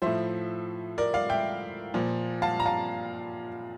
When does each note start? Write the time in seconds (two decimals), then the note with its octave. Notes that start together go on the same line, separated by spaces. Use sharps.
0.02 A2 F3 C5 E5
0.98 A#4 D5
1.14 D5 F5
1.30 E5 G5
1.94 A#2 F3
2.42 F5 A5
2.60 A#5
2.66 F5 A5